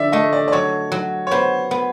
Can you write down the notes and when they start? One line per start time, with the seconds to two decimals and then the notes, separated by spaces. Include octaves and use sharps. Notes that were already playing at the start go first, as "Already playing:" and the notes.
Already playing: D3 F3 D5 E5
0.12 A3 D#5
0.33 D5
0.48 D5
0.52 F#3 C#5
0.92 F#3
1.27 C#5
1.31 B3 C5
1.71 B3